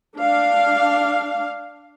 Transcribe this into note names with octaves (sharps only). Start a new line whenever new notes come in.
D4 F5